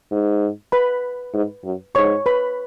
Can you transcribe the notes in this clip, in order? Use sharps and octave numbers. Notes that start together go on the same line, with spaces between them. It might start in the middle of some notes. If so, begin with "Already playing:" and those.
G#2
B4 B5
G#2
F#2
G#2 C#5 C#6
B4 B5